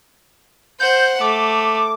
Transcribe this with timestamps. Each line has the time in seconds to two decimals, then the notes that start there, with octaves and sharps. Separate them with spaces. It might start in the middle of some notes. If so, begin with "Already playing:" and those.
0.80 C5 F#5 G6
1.21 A3 D6